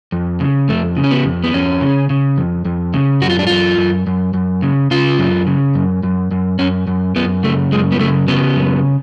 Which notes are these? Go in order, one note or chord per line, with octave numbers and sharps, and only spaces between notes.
F2
C#3
F2 A3
C#3
C#4
B3
F2
B3
F2 C#4
C#3
C#3
F2
F2
C#3
F#2 F#4
F4
D4
F#2 F4
F#2
F#2
F#2
C#3
C#3 F4
F#2
C#3
F#2
F#2
F#2
F#2 C#4
F#2
F#2 B3
C#3 A3
F#2 G#3
B3
C#3 A3
C#3 B3
F#2